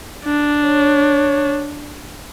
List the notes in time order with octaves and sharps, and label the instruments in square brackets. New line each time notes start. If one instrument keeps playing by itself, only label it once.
[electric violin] D4
[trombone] C#5